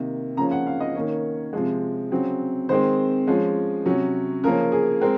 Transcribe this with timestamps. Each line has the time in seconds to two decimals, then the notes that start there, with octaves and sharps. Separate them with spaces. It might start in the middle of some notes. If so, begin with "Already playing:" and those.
Already playing: C3 D#3 A#3
0.37 C#3 F3 A#3 C#4 A#5
0.51 F#5
0.67 F5
0.80 D#5
0.95 D#3 A#3 C#4 C#5
1.53 C3 F3 G#3
2.11 C#3 F#3 C4
2.69 D#3 G#3 C4 C5
3.27 F3 G#3 C#4
3.85 C3 F#3 C#4
4.43 C#3 F3 A#3 C#4 A#4
4.72 G#4
5.01 G#3 C4 A#4